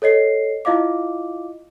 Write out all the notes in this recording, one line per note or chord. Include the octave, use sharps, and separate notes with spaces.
A4 C#5 D#5 C7
E4 F4 D#5 F5 D6